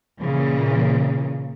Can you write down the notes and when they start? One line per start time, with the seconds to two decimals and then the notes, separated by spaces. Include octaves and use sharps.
0.19 A#2 C#3 E3